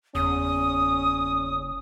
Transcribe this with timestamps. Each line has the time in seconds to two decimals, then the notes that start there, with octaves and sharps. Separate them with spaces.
0.15 F#1 E2 C#4 D#6